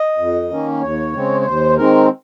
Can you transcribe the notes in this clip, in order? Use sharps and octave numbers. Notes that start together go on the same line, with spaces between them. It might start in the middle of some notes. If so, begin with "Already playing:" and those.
Already playing: D#5
F2
D#3 A#3 C#4
D#2 C#5
C#3 G#3 C4
C#5
D#2 C5
D#3 G#3 C4 A#4